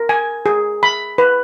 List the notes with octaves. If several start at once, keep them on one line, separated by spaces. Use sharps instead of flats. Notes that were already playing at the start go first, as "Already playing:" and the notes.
Already playing: A#4
G#5
G#4
B5
B4